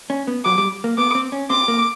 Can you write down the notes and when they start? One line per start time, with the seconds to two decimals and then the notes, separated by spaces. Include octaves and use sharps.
0.10 C#4
0.27 B3
0.45 F#3 D6
0.58 G3
0.84 A#3
0.98 B3 D6
1.15 C4
1.32 C#4
1.50 C4 D6
1.68 A#3